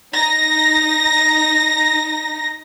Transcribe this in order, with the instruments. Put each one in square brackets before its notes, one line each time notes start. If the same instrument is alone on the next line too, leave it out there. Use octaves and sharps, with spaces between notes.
[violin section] D#4 A#6